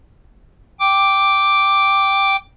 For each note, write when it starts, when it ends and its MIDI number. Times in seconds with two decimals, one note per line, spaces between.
0.80 2.36 79
0.80 2.36 86